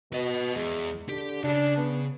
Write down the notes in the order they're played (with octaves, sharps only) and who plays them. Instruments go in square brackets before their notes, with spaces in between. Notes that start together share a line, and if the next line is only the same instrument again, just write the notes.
[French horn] B2 [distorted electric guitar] B4 D#5
[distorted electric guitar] E2 [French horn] G#3
[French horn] D3 [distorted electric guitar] G4
[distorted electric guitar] C#3 [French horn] D4
[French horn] B3